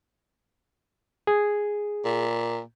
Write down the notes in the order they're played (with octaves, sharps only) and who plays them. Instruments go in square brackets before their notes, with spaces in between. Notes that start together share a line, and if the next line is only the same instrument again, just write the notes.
[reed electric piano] G#4
[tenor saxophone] A#2